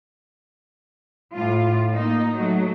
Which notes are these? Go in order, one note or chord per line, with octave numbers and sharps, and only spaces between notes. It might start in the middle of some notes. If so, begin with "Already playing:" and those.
A2 F4
A#3 D#4
F#3 A3